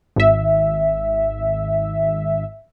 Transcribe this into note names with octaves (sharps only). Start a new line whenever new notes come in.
G#1 E5